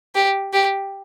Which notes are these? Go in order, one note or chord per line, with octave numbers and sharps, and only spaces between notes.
G4
G4